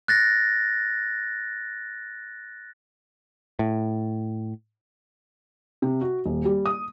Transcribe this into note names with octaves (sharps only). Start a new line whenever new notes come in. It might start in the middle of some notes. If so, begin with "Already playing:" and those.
F#6 A6 A#6
A2
C3
F#4
D#1
G3
D#6